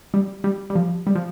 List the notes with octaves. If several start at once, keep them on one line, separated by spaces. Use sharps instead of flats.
G3
G3
G3
F3
G3
F3